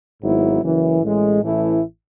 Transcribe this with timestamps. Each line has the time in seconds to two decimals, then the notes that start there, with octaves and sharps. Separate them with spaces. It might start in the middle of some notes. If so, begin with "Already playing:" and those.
0.22 G#1 G#2 F#3 B3 E4
0.62 F#1 F#2 E3
1.02 A1 A2 G#3
1.41 A1 A2 E3 A3 E4